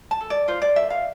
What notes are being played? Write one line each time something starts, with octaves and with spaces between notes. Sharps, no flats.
A5
A4
D5
F4 C5
D5
A4 E5
F5